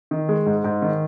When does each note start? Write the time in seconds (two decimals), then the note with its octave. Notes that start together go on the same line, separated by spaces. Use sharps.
0.11 D#3
0.29 G#3
0.46 G#2
0.64 G#2
0.82 D#3